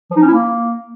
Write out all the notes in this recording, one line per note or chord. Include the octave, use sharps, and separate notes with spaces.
F3
D#4
C#4
E4
A#3